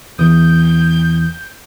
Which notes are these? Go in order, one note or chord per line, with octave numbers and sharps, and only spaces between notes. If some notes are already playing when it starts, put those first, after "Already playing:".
E2 E3 D#6 G6